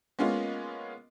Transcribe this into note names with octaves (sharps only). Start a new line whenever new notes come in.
G#3 A#3 B3 C#4 F4 D#5